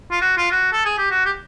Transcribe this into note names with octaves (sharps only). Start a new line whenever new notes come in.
F4
F#4
F4
F#4
A4
G#4
G4
F#4
G4